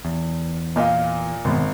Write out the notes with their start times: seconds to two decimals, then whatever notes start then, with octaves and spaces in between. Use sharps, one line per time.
0.05 E2
0.76 A#2 D#5 F5
1.45 G#1 B2 D#3 B3